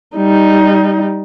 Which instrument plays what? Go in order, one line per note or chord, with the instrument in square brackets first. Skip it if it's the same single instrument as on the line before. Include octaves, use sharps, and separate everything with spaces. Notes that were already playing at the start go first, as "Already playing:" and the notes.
[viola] G3 D#4